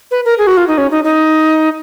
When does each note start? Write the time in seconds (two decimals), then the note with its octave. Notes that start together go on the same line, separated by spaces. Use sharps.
0.11 B4
0.25 A#4
0.38 G#4
0.47 F#4
0.57 F4
0.68 D#4
0.78 C#4
0.91 D#4
1.04 D#4